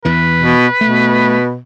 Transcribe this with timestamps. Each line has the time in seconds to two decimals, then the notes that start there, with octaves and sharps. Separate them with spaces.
0.05 E2 E3 B4
0.38 B2
0.81 B2 A3